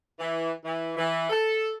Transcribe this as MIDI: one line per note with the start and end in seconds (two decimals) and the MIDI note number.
0.19 0.49 52
0.64 0.92 52
0.97 1.28 52
1.30 1.71 69